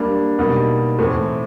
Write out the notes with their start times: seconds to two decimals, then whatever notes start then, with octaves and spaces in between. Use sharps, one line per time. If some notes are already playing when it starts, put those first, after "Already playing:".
Already playing: G3 A#3 D4
0.39 B2 G3 A#3 D#4
0.98 A2 E3 A3 C4